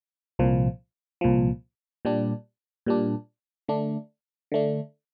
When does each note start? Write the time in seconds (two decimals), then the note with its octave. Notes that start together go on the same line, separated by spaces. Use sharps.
0.39 C2 A#2 F3
1.21 C2 A#2 F3
2.05 A#2 G3 D4
2.86 A#2 G3 D4
3.68 D3 A3 D4
4.52 D3 A3 D4